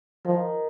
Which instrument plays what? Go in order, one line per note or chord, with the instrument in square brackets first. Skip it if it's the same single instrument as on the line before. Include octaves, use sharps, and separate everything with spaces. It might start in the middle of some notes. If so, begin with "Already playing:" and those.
[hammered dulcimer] D#3 [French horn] F3